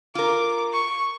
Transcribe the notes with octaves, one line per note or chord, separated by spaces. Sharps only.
F4 A#4 D6
C#6